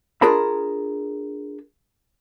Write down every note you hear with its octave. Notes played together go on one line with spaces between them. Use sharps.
D4 F4 G#4 A#4 A5 B5